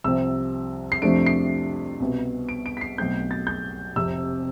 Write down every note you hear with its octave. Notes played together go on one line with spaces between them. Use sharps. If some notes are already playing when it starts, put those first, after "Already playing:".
C2 C3 F3 C4 E6
C7
F2 C3 F3 A3 D4 D7
C7
C2 B2 B3
D7
D7
B6
C7
B1 B2 A3 C4 G6
A6
G6
F1 F2 C3 E6